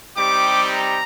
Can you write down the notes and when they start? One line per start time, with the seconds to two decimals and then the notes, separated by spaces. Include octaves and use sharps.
0.16 G3 C4 D#4 G4 D6
0.70 A#5